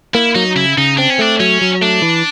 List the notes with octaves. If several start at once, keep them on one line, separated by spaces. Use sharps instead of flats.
A#3 E4
F#3 D#4
C#3 E4
C#3 D#4
C4 D4
C#4
A3 D4
F#3 C#4
F#3
A3 D4
E3